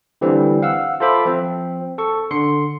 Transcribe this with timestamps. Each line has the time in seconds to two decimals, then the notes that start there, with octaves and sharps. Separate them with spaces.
0.21 D3 E3 G3 C4
0.62 F5 F#5 E6
1.00 F4 A4 C5 E5 B5 D6
1.25 F3 C4
1.98 A4 C#6
2.30 D3 C6 C#7